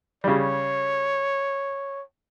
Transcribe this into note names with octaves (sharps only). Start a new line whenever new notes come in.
C#3 G3 C#5